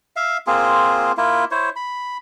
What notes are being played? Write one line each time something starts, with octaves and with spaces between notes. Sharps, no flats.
E5 F5
A#3 C4 F4 G#4
A#3 E4 F4
E4 C5 C#5
B5